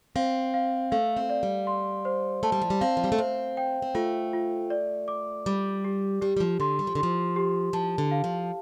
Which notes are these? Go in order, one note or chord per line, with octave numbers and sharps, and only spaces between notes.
C4 F5
F5
A3 F5
C4
D5
G3
C6
C5
A3 A5
G3
F3
G3
C4 F5
F3
G3
A3
C4 C5
G5
C4
A3 F4
F4
D5
D6
G3 D6
G4
G3 G4
G3
F3
D3 C6
G3
F3
D3
F3 C6
G4
F3 A5
D3
F5
F3